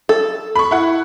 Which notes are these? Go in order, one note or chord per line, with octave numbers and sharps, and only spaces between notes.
A4
B5 C#6
E4 F#5